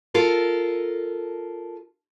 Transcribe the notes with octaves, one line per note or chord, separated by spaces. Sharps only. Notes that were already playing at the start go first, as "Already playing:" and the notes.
F4 A4 A#4